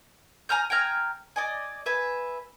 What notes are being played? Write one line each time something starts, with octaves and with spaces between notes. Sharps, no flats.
G#5 A#5 F6 G6
G5 G#5 A#5 F6
D5 D#5 G#5
B4 E5 G#5